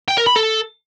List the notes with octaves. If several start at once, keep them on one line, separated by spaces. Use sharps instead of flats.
G5
A#4
B5
A4